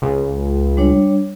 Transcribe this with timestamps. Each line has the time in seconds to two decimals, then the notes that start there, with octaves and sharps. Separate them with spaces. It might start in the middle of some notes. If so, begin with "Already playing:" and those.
0.02 C#2
0.77 G3 D4 C#5